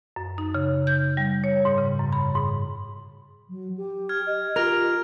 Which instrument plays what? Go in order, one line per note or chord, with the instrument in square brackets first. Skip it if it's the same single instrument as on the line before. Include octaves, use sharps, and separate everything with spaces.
[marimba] F#2
D#4
C#3
G6
G3
C#5
G#2
C#3
F#2
B5
G#2
[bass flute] F#3
G4
[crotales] F6 G#6
[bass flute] D#5
[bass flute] F4 [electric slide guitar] G4 A#4 [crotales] F6 A#6 F7